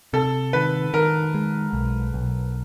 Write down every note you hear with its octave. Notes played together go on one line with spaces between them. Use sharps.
C3 A4
D#3 B4
D#3 A#4
G#3
B1
B1